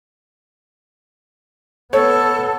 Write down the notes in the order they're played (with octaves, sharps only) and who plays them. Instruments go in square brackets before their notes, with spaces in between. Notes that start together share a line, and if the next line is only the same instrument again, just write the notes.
[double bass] B3 [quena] A4 [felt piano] C#5